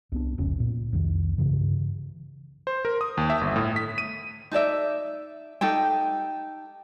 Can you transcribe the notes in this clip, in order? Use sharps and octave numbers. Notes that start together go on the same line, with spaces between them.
C2 B3 D4
F1 C#2 C#4
A#2
C2 F2 D#3
G2 C#3 E3
C5
A#4
D#6
D#2
E5
G1
A2
B6
D#7
D#4 A4 D5 E5
D#4 G4 A4 G5